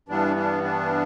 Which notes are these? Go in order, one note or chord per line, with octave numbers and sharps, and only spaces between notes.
G2 E3 G3 B3 D4
D4
D4